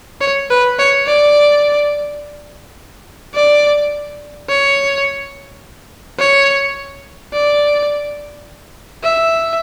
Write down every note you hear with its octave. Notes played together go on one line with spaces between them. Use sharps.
C#5
B4
C#5
D5
D5
C#5
C#5
D5
E5